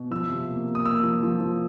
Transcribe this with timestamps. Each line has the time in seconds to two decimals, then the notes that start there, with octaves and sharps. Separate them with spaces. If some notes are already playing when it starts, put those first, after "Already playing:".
Already playing: B2
0.11 F3 E6
0.29 C3
0.48 A#3
0.67 A#3
0.75 D#6
0.85 A#3 E6
1.03 F3
1.23 F3
1.41 F3